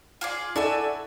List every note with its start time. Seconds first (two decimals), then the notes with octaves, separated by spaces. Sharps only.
0.21 F4 G#4 D5
0.56 E4 F#4 A4 D5 G#5 E6